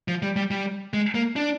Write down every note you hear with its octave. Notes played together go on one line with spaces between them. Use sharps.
F3
G3
G3
G3
G#3
A#3
D4